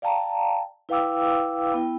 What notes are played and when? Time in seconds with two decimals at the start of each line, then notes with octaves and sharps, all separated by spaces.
0.02 D5 F5 G5 A5 A#5
0.89 E4 B4 F5 G5 D6 E6
1.74 B3 E4 G5